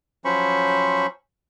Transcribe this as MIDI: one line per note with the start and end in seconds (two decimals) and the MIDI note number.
0.25 1.07 53
0.25 1.07 54
0.25 1.07 61
0.25 1.07 72
0.25 1.07 83
0.25 1.07 85